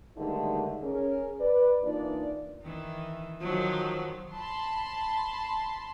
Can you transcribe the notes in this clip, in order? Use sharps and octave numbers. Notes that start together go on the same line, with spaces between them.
G2 D3 D#3 G#3 A3 D#4
C#4 G#4 A#4
B4 D5
E3 A#3 D4 D#4 F4 D5
D#3 E3
D#3 F3 F#3
A5 B5 C6